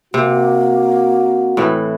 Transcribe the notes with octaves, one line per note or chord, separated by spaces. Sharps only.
C3 A#3 F#4
A2 E3